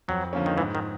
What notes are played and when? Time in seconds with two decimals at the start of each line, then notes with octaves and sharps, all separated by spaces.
0.08 F2 F#3
0.33 D3 F3 A#3 C#4
0.46 D#3
0.58 G#2 E3
0.75 D#3